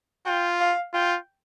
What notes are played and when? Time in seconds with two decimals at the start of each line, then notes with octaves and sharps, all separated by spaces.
0.26 F4 G5
0.60 F5
0.94 F4 G5